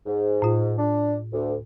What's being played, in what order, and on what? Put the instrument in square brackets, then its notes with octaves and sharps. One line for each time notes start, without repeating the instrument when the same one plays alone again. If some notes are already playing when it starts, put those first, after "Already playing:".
[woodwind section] G#2
[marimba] A2 F4
[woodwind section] D4
D2